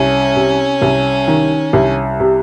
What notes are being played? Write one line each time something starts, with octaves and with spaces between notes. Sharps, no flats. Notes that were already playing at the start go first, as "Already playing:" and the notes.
Already playing: C2 C#4
C3
C2
D#3
C2
C3